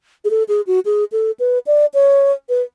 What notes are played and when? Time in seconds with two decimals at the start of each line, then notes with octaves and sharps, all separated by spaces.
0.25 G#4
0.31 A4
0.48 G#4
0.67 F#4
0.85 G#4
1.12 A4
1.40 B4
1.67 D5
1.94 C#5
2.49 B4